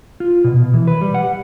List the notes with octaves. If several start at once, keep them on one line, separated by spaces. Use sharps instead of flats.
F4
B2
B2
E3
B4
G3
F#5